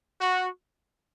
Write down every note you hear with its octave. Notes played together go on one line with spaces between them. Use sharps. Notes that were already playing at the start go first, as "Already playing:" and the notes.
F#4